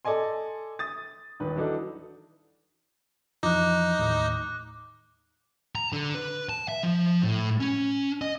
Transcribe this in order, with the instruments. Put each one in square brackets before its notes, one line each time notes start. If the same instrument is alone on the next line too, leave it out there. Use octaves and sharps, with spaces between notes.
[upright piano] A4 D5 D#5 G#5 C6
D#6 A6
D#1 D#3 B4
E3 F#3 D4 D#4 A4
[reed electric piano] F2 E3 F3 [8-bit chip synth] D#4 [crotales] D6 F#6
[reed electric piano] D#2 A2
[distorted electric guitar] A#5
D3
B4
A5
E5
F3
A2
C#4
D#5